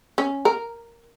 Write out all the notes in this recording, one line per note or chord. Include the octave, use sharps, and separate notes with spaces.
C#4
A#4